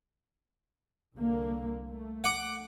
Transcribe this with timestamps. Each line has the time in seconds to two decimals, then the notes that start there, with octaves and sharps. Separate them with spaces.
1.16 C2 D3 A#3
1.89 A3
2.24 F#5 D6